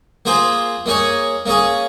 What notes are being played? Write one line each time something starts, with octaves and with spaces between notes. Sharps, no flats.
A#3 F4 G#4 C5
A#3 D#4 G#4 C#5
A#3 C#4 G#4